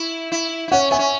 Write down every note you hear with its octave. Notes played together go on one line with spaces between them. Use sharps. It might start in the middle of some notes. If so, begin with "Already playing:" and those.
Already playing: E4
E4
E4
C#4 C#5 F#5
B3 E5 G#5
C#4